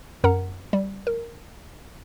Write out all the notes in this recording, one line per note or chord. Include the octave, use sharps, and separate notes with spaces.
F#2 A#4 F#5 A#5
G3
A#4